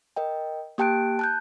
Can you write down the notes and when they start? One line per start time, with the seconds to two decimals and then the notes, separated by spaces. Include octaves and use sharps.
0.16 A#4 D#5 G5
0.78 A#3 G4 G5 A5 F#6 D7
1.19 A5 F#6 G6